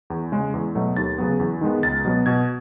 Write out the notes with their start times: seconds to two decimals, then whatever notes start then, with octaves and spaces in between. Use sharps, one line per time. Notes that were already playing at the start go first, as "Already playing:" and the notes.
0.10 E2
0.32 C#3 G#3
0.54 E2
0.75 B2 F#3 A3
0.97 D#2 A6
1.18 C#3 F#3 B3
1.40 E2
1.61 D#3 G#3 B3
1.83 C#2 A6
2.05 B2 F#3 B3
2.26 B2 G#6